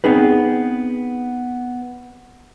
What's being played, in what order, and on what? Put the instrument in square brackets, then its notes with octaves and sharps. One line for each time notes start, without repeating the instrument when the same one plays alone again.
[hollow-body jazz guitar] B3 C4 D#4 G#4 B4